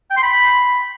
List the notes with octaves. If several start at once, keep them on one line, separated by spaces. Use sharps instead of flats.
G5
C6
B5